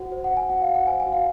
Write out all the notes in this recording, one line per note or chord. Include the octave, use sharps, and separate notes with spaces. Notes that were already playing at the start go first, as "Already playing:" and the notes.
Already playing: F#4 C5 F#5
C5
F#5
C5
G#5
F#4 F#5
F5
F#4
F#5
C5 G#5
G#5
F#4
F5